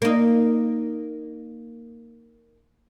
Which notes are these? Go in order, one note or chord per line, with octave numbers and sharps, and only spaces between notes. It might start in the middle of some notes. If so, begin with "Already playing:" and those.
A#3 D#4